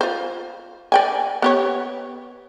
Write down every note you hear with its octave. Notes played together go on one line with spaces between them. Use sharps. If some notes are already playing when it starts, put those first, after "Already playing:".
F4 C5
D5 G5 G#5
B3 G4 C#5